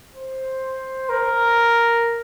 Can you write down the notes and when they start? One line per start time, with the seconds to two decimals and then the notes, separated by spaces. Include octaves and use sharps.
0.14 C5
1.09 A#4